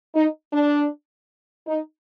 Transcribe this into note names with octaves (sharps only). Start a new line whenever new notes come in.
D#4
D4
D#4